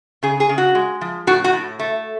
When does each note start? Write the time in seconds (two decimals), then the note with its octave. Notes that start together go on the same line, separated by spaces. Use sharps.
0.23 C#3 G#4
0.40 G#4
0.49 C#3
0.58 F#4
0.75 G#3
1.01 F3
1.27 A2 F#4
1.44 F#4
1.53 A2
1.79 A3